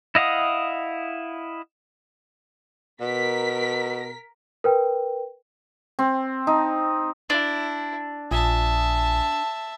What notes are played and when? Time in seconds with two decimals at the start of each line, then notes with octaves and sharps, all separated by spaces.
0.15 E4 D#5 F5 F#5 D#6
3.01 B2 A#4 B6
4.64 A#4 B4 G5
5.99 C4
6.47 D#4
7.30 D4 E4
8.31 A#1 E5 G#5 A5 D#6